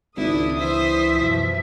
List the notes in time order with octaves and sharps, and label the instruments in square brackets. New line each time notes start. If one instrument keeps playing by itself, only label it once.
[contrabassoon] G#1 [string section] C#2 D#6 [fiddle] D4 E4
[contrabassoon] E3 [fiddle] C5 [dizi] E5
[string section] F#2 B2 F3